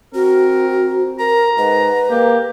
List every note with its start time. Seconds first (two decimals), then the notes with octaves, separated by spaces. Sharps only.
0.15 C4 F#4 A#4
1.19 A#4 A#5
1.58 G#2 B4
2.10 A#3 G4